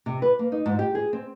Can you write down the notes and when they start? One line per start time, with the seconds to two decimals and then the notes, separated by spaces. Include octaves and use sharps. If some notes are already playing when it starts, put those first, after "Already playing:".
0.06 C3
0.22 B4
0.39 A#3
0.52 D#4
0.66 G#2
0.79 G4
0.95 G#4
1.13 C4